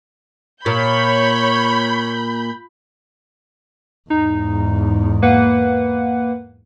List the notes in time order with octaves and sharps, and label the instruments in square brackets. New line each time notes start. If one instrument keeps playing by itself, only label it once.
[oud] A#2 [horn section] C#5 [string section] B5 G6
[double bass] E2 G#2 [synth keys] D#4
[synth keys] A#3 B4 F#5